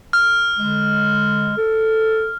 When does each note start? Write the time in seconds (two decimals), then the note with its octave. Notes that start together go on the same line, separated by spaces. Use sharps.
0.13 F6
0.57 D3 G#3
1.58 A4